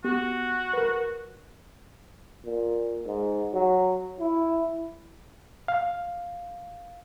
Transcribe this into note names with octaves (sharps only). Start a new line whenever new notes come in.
B3 F#4 G4
A#4 B4
A#2
G#2
F#3
E4
F5